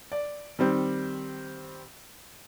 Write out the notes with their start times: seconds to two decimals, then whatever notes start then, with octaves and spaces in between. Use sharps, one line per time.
0.12 D5
0.59 D#3 G3 C4